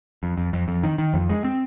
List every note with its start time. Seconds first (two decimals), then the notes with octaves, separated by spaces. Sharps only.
0.23 F2
0.38 F2
0.53 F2
0.68 F2
0.83 D#3
0.98 D#3
1.14 F2
1.29 G#3
1.44 C4